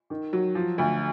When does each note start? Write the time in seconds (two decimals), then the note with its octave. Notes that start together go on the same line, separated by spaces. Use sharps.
0.10 D#3
0.33 F#3
0.55 F3
0.78 D2